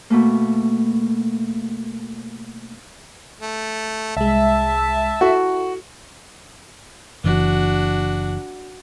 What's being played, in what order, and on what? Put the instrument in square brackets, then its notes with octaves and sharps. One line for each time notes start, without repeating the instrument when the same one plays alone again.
[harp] B2 A3 A#3
[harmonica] A3
[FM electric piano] C2 G#3 [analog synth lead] E5 [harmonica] A5
[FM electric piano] E4 A4 [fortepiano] F#4
[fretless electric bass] F#1 E3 [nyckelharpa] D4 F#4